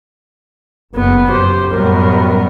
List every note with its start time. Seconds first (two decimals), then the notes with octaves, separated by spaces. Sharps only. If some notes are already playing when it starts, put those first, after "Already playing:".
0.96 F#1 B3
1.28 F#2 G4 C5
1.71 F#2 A2 G3 B3 A#4